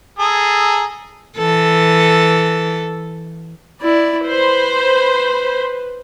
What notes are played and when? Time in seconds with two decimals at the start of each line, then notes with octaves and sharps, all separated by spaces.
0.19 G#4 A4 A#5
1.38 E3 A4
3.82 E4 D5
4.26 B4 C5 B5